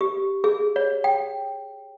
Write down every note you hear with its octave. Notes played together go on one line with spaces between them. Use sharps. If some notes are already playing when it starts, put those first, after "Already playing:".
G4
G#4
C#5
G5